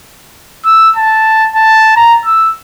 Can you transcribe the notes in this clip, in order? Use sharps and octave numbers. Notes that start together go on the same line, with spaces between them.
E6
A5
A5
A#5
E6